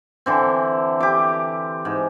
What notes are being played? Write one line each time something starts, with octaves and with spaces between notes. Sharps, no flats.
D3 E3 C4
G4 D6
G#2